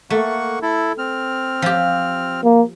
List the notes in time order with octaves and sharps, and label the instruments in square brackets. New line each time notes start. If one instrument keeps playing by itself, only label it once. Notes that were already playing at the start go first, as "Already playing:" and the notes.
[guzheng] A3 [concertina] A#3 F#5 C#6
[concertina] E4 A4
C4 F6
[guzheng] F3 G4
[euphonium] A#3